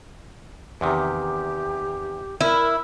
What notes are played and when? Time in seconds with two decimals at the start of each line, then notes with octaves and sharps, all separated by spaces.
0.81 E2 C3 D#3 G4
2.41 E4 A#4